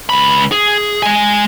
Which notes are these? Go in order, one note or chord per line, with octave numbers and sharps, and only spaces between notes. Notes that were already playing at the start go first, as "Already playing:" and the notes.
C#2 B5
G#4
G#3 G#5